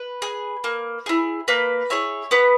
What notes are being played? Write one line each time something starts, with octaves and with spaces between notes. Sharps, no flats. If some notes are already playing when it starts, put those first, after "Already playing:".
Already playing: B4
G#4
A#3
E4 G#4
A#3 B4
E4 G#4 C#5
B3 B4